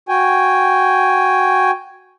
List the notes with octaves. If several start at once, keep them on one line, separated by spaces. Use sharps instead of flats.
F#4 G5 G#5